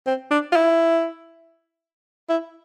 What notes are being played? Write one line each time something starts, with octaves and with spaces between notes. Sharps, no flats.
C4
D4
F4
E4
E4